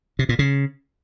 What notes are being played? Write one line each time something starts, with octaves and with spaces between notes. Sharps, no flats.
C3
A#2
C#3